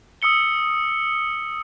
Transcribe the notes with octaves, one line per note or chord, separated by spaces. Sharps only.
D#6 E6 C#7 G7